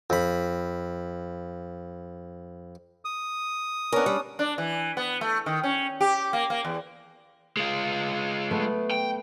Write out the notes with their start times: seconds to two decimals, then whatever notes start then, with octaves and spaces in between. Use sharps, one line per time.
0.10 F2 B5
3.05 D#6
3.92 B3 C#4 D4 A#4
4.06 G3
4.39 D4
4.58 E3
4.97 B3
5.21 A3
5.46 D#3
5.63 C#4
6.01 G4
6.33 A#3
6.50 A#3
6.65 E2
7.57 G#3 F4
8.51 A3 B3
8.91 G5